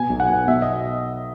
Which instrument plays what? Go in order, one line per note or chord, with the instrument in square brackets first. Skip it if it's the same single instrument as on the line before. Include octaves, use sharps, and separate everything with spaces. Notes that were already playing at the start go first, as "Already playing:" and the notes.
Already playing: [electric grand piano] B2 G#5
B1
F#5
B2
B2 E5
D#5